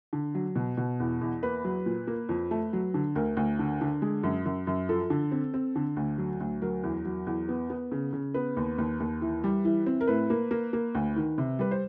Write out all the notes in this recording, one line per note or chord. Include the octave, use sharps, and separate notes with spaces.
D3
F#3
B2
B2
E2
E2
A#3 B4
F#3
A#2
A#3
F2
A3
F#3
D3
D2 A#4
D2
D3
D3
G#3
F#2
F#2
F#2
F3 A4
D3
C4
C4
D3
D2
F#3
D2
F#3 A#4
E2
F#3
E2
B3
B3
C#3
C#3
B3 B4
D#2
D#2
D#2
E3
G3
E3
C4
A#4
A2 B4
A#3
A#3
A#3
D2
D#3
C3
G3 B4
C5